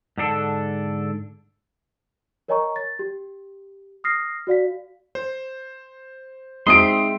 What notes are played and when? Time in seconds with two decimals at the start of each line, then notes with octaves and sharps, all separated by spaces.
0.18 G#2 D3 D4 A4
2.48 A#4 C#5 D#5 G#5 A#5 C#6
2.76 A6
2.99 G4
4.04 D#6 F6 A#6 C7
4.47 F#4 D5 F5 B6
5.15 C5
6.67 G#3 C4 D#4 E5 C6 D#6 C7 D7